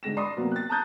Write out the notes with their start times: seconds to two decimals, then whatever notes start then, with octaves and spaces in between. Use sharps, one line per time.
0.03 G#2 D3 G#3 A#6 E7
0.17 D5 B5 C6 D6 D#6
0.36 F#2 C3 F#3 A#3 B3
0.52 F#6 A6
0.69 A5 A#5 D#6 F#6 G6 A6